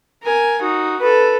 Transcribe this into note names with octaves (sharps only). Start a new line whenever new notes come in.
A#4 G#5
D#4 F#4
A4 B4